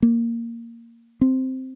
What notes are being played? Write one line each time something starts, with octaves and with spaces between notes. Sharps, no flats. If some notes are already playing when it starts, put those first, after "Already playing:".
A#3
C4